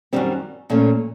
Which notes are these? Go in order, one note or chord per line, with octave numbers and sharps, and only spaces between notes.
F#2 D#3 G3 C4
A#2 F3 A3 C#4